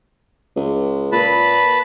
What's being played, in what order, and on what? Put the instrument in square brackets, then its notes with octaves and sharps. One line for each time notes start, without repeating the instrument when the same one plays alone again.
[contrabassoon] C#2
[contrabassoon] A#2 [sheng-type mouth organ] B4 A5 B5